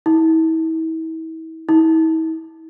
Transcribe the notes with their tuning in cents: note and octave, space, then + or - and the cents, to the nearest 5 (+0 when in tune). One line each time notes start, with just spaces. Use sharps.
E4 -40
E4 -45